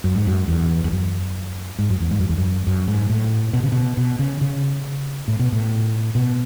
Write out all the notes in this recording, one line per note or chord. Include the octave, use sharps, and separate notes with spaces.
F#2
G#2
F#2
E2
E2
F#2
G#2
F#2
E2
G#2
F#2
E2
F#2
F#2
G#2
A2
B2
C#3
B2
B2
C#3
C#3
A2
B2
A2
B2